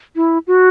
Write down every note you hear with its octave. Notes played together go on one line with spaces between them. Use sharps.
E4
F#4